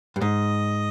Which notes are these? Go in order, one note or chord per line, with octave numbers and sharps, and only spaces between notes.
G2
G#2 D#5